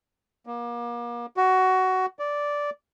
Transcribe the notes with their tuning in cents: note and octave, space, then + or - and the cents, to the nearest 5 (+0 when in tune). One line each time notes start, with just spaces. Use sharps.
A#3 +35
F#4 +15
D5 -10